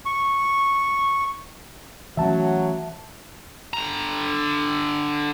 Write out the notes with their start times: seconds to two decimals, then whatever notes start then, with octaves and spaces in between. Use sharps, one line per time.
0.06 C#6
2.17 E3 F#3 A3 C#4 E5 A5
3.73 D3 A#5